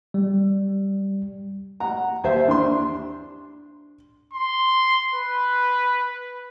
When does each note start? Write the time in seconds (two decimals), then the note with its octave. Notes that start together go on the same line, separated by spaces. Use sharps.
0.14 G3
1.80 F#5 A#5
2.24 D#2 C5 E5
2.48 D4 C6
4.33 C6
5.14 B4